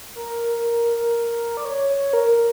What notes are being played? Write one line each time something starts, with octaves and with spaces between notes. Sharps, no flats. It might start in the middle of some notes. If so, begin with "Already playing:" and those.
A#4
D5
C#5
C#5
A#4